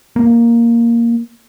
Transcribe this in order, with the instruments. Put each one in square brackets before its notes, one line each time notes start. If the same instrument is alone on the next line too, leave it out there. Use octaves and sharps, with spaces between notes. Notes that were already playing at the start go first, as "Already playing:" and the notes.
[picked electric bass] A#3